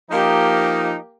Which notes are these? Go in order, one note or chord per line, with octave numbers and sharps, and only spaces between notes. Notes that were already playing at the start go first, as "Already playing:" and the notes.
F3 A#3 D#4 G4